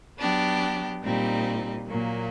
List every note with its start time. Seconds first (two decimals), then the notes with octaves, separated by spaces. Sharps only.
0.19 F#3 B3 D4 G4
1.03 A#2 G3 C4 D#4
1.87 A#2 F#3 A#3